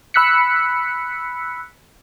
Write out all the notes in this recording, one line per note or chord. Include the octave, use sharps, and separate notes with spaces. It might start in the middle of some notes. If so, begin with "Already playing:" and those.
B5 E6 F#6 B6 C#7